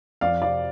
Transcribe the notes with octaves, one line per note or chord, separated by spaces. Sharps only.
F2 D5 F5
C3 F3 D5 F5